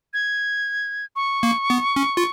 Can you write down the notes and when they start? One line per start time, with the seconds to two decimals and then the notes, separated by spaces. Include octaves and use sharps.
0.14 G#6
1.16 C#6
1.43 A#3
1.70 B3
1.96 C#4
2.17 F4